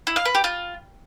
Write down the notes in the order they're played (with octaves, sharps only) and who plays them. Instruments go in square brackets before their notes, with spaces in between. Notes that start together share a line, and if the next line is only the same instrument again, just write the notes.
[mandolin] E4
F5
B4
G4
F4